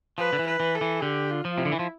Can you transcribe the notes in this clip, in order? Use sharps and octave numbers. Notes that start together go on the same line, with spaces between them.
F3 B4
D3
E3
B4
E3
A4
E3
D3 G4
F4
F3
C3 E4
D3
E3
F3